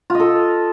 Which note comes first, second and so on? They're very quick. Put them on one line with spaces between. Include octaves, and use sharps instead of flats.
F4 D#5 A4